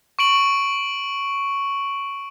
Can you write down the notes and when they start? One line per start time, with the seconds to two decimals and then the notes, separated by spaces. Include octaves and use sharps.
0.19 C#6 D7 F#7